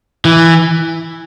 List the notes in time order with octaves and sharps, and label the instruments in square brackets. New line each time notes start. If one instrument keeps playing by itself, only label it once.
[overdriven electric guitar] E3